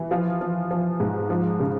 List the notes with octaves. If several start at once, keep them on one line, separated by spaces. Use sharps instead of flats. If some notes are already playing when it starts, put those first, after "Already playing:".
Already playing: E3
F3 F4
F3
F3
G#2
F3
C#3